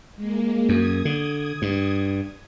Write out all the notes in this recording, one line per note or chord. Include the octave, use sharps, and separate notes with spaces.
G#3 A#3
F#2 D#6 G#6
D3
G2